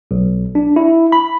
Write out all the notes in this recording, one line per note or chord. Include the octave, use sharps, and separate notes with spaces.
B1
D4
E4
B5